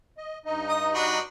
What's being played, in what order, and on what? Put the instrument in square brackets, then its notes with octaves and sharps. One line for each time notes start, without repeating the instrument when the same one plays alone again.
[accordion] D#5
G2 D#4 D#5
[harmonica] D#6
D4 F#4 B4